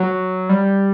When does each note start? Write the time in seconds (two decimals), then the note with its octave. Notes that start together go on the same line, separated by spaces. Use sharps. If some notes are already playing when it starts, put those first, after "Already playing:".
Already playing: F#3
0.49 G3